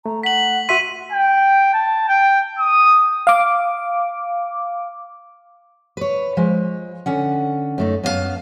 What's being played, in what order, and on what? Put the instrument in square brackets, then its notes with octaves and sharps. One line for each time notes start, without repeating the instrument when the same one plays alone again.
[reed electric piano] A3 [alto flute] A#5
[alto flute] F#5 [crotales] B6 F#7
[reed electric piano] F#4 E5 C6 [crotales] B6 D#7
[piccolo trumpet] G5
A5
G5
D#6
[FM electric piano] F5 D6
[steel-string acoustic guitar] B4 C#5
F3 G#3
D3 C#4 F#5
F#2 A3 D#4
F#2 B3 C#4 F5 A5